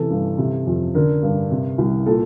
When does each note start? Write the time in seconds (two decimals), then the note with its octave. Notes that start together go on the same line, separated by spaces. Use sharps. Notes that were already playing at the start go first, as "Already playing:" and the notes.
Already playing: C3 E3 A4
0.11 G2
0.38 C3
0.67 F2
0.95 D3 A#4
1.23 G2
1.51 C3
1.78 C2
2.06 A#2 A4